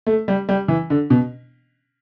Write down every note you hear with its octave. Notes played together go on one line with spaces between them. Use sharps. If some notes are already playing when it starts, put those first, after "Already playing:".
A3
G3
G3
E3
D3
B2